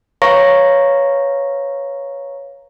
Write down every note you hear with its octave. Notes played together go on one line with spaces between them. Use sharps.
B4 C#5 F5 A#5 C#6 A#6